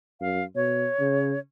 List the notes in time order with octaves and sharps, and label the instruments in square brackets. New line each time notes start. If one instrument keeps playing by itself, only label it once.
[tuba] F#2 [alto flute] F5
[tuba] B2 [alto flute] C#5
[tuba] C#3